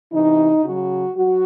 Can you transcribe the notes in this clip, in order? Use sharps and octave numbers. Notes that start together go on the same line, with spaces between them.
C3 E3 D#4
C#3 F#3 F#4
F#3 F#4